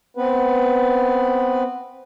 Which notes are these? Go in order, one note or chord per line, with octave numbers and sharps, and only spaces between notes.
B3 C4 B4